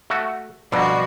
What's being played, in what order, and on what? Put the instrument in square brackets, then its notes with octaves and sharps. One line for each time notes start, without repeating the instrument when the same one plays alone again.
[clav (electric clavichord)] A3 F#4
[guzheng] B2 G3 [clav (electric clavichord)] D3 A#5 [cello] F3 F#4